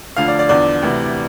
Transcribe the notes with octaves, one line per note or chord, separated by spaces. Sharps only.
D2 D3 F3 F5
D5
D5
E2 D3 F3 D5
D2 C3 E3